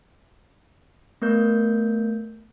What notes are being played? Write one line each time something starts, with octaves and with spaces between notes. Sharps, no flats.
A3 B3 A#4 G6